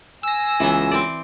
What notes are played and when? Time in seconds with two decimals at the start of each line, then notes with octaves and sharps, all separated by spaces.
0.23 G#5 E6 A#6
0.60 C#2 E3 F#3 B3
0.91 C4 D5